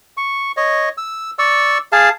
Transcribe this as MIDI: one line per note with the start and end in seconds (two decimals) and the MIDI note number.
0.17 0.52 85
0.57 0.89 73
0.57 0.89 75
0.98 1.31 88
1.39 1.78 74
1.39 1.78 85
1.39 1.78 88
1.92 2.09 68
1.92 2.09 77
1.92 2.09 81